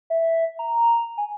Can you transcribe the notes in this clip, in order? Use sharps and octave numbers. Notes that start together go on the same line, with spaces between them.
E5
A#5
G#5